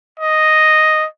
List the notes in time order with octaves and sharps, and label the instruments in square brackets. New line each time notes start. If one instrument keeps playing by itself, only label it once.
[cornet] D#5